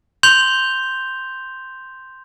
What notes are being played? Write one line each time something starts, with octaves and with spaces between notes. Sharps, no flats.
C6 G6 F7 G7